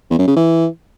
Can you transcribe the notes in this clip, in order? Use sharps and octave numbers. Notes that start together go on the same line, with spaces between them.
E2
F#2
C#3
E3